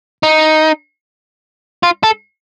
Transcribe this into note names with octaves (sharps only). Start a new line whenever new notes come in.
D#4
F4
A4